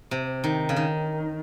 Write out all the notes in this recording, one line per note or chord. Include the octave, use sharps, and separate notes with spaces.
C3
D#3
C#3
D#3